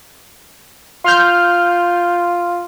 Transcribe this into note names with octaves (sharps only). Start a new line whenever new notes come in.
F4 C6 F6 G6